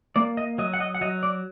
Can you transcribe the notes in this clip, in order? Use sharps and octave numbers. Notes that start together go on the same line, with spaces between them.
A#3 D5
D#5
F#3 D#5
F#5
D#5
F#5
F#3 D#5
D5